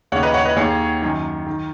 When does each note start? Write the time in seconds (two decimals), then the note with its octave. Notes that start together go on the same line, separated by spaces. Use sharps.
0.12 D#2 C#3 C#5 F#5
0.23 B4 D#5
0.34 C#5 F#5
0.45 B4 D#5
0.56 D#2 D#3 G#4 C#5
1.02 F#2 D#3
1.47 D#3